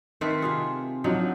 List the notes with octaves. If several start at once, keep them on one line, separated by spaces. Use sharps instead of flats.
D#3 A3 C4 B4
C3 F4 G#4
D3 F3 F#3 D#4